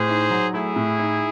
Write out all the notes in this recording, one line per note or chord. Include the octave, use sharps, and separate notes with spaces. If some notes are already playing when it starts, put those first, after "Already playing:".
Already playing: A2 G#4 C5
D#4
F#3
A3 E4 G#4
A2
D#4